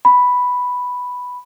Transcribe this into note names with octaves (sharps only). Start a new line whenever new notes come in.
B5